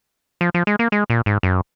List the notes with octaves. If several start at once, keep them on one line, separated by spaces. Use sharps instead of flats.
F3
F3
G#3
A#3
G#3
A#2
G#2
F#2